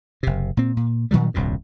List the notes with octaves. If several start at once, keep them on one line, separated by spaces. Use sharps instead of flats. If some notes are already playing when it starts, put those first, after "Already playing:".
F#1 C3
A#2 C4
A#2
A#2 D#3 F#3 G3
D#1 C2 G2 A#2